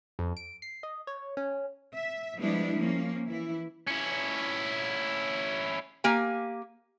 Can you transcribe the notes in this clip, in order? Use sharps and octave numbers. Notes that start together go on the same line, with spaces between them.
F2
D7
C7
D#5
C#5
C#4
E5
F3 G3 G#3 B3 D4 E4
F3 A#3 C#4
E3 E4
C#4 E4
A#3 G4 G#5